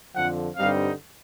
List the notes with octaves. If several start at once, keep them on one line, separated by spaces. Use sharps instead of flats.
F2 D3 F3 F#5
G2 D3 G3 C4 D#4 F5